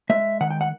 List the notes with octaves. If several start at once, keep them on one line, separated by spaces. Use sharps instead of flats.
G#3 E5
D#3 F#5
G5
F#5